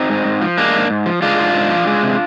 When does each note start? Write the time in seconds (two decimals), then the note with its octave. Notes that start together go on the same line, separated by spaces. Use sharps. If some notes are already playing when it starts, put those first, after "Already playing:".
Already playing: C4 D#4
0.10 G#2
0.26 G#2
0.42 F3
0.58 G#3 A#3 D4
0.74 G#2
0.90 G#2
1.06 F3
1.22 G#3 D4 F4
1.39 G#2
1.54 G#2
1.70 F3
1.87 G#3
2.03 C3